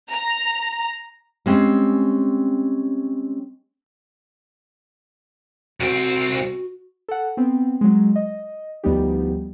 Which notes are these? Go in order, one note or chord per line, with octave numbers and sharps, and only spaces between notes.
A#5
G3 G#3 C4 C#4
C2 C4 F#4
A4 F#5
B3 C4
F#3 G#3
D#5
D2 F3 G3 B3 D#4 G4